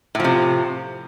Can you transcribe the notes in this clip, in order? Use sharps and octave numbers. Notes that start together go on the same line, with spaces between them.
A2 C3 F3